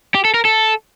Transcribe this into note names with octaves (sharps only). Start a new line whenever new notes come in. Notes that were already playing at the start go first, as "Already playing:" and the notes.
G4
A4
A#4
A4